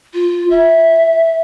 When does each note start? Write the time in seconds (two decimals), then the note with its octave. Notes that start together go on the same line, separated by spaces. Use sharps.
0.14 F4
0.50 E5